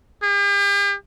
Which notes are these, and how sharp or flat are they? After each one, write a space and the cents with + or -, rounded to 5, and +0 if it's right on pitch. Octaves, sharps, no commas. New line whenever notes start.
G4 +45